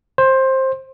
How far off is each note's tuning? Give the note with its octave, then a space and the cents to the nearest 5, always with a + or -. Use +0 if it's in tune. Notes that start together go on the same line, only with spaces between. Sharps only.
C5 +15